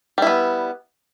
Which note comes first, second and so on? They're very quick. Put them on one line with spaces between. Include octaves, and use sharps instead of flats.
G3 E4 B3